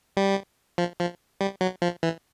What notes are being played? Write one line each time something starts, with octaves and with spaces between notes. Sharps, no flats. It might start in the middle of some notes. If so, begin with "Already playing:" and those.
G3
F3
F3
G3
F#3
F3
E3